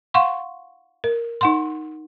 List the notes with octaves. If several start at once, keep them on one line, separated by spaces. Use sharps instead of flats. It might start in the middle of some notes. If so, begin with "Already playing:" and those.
F5 F#5 C6 C#6
A#4
D#4 F#5 C6